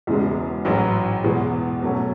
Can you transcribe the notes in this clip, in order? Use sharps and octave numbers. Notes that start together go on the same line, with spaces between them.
E1 E2 C#3 G#3
A1 G#2 F#3
E2 B2 G#3
B2 F#3 A3 C#4